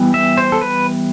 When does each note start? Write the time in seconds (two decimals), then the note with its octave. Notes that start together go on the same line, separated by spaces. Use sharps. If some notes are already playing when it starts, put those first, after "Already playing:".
Already playing: E3 G3 B3
0.14 E5
0.37 C5
0.52 A4
0.61 B4